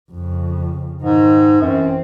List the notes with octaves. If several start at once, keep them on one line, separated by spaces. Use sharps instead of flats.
F2 C#3
G#2 D#3 D#4
F#2 E3 C4